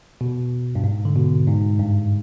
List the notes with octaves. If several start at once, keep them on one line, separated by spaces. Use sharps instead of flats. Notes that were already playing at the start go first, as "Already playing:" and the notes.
B2
G2
G#2
D3
B2
G#2
G2